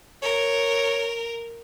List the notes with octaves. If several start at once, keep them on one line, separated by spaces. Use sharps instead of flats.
A#4 C#5